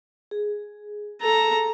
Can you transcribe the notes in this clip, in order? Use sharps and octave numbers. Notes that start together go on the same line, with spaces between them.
G#4
A4 A#5